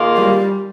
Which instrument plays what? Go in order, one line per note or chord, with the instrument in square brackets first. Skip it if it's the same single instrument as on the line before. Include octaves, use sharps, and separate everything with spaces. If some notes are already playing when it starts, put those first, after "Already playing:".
Already playing: [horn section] D#3 A#3 F4 G#4
[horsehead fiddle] G3